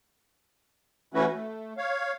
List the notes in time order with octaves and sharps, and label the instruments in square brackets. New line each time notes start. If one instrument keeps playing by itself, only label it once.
[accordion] E3 A3 C#4 E4 F#4 B4
A3
C#5 F5